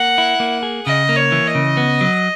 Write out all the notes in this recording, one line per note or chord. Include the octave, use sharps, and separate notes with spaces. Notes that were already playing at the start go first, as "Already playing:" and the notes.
Already playing: A#3 F#5
E4
A#3
G#4
C#3 D#5
A#3
C#5
E3
D#5
C#3
B3
F#3